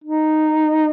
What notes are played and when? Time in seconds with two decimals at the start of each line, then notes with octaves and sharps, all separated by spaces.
0.04 D#4